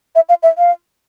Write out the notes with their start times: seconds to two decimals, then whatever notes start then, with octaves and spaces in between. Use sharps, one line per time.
0.15 E5
0.29 F5
0.43 E5
0.58 F5